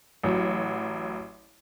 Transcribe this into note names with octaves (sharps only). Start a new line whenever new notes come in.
A1 F#3